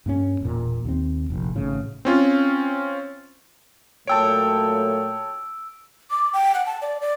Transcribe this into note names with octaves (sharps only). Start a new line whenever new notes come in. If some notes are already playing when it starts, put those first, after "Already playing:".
G2 A#3 C#4
E1 A#2
D#2 C4
F1 A#1
G#1 A2 C#3 E3
C4 C#4 F4
A#2 F#3 A3 C#5 G5 A5 E6 D7
D6
G5
F#5
A5
D5
D5